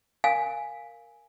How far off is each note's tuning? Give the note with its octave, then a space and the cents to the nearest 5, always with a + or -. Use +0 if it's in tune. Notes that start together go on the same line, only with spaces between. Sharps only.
A#4 +0 F5 +0 G#5 +0